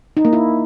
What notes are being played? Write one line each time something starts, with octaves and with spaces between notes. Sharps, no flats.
D#4
A#3
E4